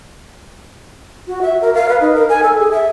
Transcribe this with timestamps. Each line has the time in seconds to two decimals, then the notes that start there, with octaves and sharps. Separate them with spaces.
1.27 F#4
1.42 E5
1.61 A#4
1.75 F5
1.89 B4
2.01 D#4
2.14 A#4
2.29 G#5
2.43 A4
2.59 G#4
2.71 E5